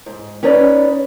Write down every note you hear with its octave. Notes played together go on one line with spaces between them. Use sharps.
G#2
C#4 D#4 B4 C#5 D5